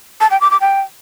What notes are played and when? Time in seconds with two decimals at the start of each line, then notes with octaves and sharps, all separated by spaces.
0.21 A5
0.31 G5
0.41 D6
0.51 D6
0.61 G5